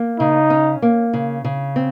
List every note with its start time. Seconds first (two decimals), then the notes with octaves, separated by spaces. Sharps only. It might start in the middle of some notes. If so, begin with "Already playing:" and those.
Already playing: A#3
0.19 C#3 D#4
0.50 C#4
0.82 A#3
1.13 C#3
1.44 C#3
1.76 C4